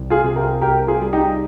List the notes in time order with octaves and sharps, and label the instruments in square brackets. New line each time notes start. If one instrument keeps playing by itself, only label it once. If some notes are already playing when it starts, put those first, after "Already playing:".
Already playing: [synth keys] C2 G3
[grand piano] F4 G#4
[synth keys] C3
[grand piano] G4 A#4
[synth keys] C2 [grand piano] G4 A#4
[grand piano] F4 G#4
[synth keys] G3
[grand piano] D#4 G4